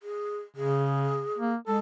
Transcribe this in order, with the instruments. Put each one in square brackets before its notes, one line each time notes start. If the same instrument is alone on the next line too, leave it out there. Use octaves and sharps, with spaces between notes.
[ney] G#4
[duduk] C#3 [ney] G#4
[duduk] A#3
[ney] G#3 [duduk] A4